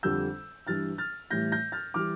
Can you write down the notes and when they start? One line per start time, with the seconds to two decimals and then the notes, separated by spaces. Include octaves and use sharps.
0.03 F2 D3 G3 E6 G6
0.67 G2 E3 G3 F6 A6
0.98 F6 A6
1.31 A2 E3 G3 G6 A#6
1.52 G6 A#6
1.72 F6 A6
1.94 E3 G3 D6 F6